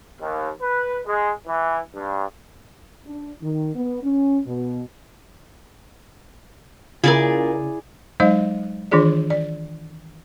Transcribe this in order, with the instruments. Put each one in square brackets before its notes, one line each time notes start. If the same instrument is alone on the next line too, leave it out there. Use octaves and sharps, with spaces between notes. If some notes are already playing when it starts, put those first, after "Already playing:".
[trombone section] D#2
B4
G#3
E3
G2
[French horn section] D4
D#3
B3
C#4
B2
[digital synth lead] C#3 [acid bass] E4 [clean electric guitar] F4 A#4 [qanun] G#4 D5 G#5
[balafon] F#3 G#3 D#4 C5 D#5 F5
D#3 E3 D4 F4 G#4 D5
D5